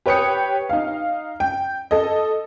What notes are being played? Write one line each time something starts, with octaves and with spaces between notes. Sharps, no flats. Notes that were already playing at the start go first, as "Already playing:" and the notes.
G4 B4 C#5 G5 D#6 C#7
D#4 F5
G5
A4 D#5